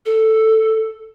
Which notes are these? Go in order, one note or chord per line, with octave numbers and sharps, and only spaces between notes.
A4